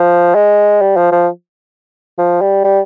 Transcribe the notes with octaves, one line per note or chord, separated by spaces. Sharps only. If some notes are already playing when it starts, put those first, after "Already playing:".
Already playing: F3
G#3
G3
F3
F3
F3
G3
G3